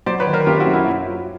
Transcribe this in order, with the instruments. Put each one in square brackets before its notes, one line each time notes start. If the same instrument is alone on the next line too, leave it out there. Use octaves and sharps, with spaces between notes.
[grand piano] F#3 [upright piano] C5 D5
[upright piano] B4 C#5
[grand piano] D#3
[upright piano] A#4 C5
[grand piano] F#2 [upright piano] F4 G4
[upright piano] E4 F#4
[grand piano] F#2
[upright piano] E4 F#4
[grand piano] F#3
F4